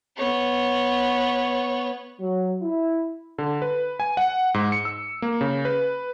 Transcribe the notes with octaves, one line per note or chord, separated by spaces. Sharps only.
B3 C#5
F#3
E4
D3
B4
G#5
F#5
G#2
C#7
E6
A#3
C#3
B4